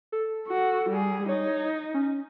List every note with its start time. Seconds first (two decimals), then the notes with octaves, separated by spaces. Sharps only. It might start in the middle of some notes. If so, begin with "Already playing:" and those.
0.12 A4
0.48 F#4
0.90 G3 G#4
1.28 D#4 C#5
1.94 C#4